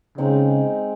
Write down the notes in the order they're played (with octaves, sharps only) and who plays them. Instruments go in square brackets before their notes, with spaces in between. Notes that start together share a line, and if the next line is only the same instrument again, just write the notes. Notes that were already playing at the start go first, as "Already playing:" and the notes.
[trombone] C#3 [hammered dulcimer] G#3 C4 D#4